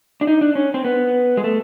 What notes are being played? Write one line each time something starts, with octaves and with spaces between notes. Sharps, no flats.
D4
D#4
D4
C#4
C4
B3
G#3
A3